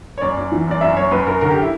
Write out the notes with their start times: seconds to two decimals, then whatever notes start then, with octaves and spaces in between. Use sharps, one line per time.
0.18 C#5
0.21 F#2 D5
0.37 F#2
0.52 E3
0.67 F#2 D5
0.81 F#2 E5
0.97 F#2 C#5
1.11 F#2 B4
1.26 F#2 A#4
1.41 D3 A#4
1.51 G4
1.62 E4